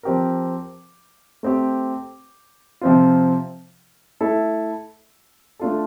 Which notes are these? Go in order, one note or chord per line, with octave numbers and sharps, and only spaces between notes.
F3 C4 G4 A#4
A3 C4 G4
C3 F3 C4 F4
A3 E4 A4
A3 D4 F4 A4